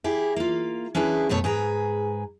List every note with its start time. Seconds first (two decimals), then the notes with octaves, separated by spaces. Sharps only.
0.04 E4 G4 G#4
0.36 A#3 F4
0.95 C#4 D4 E4 G#4 B4
1.29 F#2 B2 A3 C#5
1.44 G#2 G#4 B4 A#5